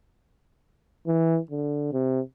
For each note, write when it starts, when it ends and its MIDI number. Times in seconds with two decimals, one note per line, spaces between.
1.07 1.39 52
1.51 1.91 50
1.93 2.20 48